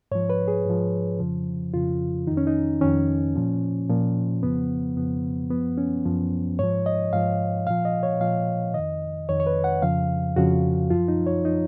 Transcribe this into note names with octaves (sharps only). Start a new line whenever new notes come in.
G#2 F3 C#5
B4
G#4
G#2 F3
F2 C#3 F3
F2 C#3 F3 F4
F2 D#3 D#4
C#4
D#4
F2 D#3 C#4
A#2 F3
A#2 F3
F2 C#3 F3 B3
F2 C#3 F3 B3
F#2 F3 B3
C#4
F#2 F3
G#2 F3 C#5
D#5
G#2 F3 F5
A#2 F3 F5
D#5
C#5
A#2 F3 F5
F2 D#3 D#5
F2 D#3 C#5
C#5
B4
F#5
F2 C#3 F3 F5
F2 C#3 F3 F#4
F#2 F3 F4
D#4
C#5
F3 D#4